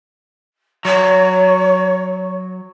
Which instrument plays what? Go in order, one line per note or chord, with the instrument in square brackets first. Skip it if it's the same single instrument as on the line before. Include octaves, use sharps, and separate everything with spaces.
[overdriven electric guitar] F#3 [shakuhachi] C#5